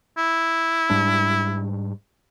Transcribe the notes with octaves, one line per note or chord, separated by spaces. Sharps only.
E4
G#2 G3 D4